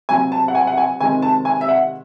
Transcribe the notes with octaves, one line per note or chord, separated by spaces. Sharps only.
C3 F#3 C4 G#5
A5
F#5
G#5
F#5
G#5
C3 D#3 G#3 G#5
A5
G#5
E5
F#5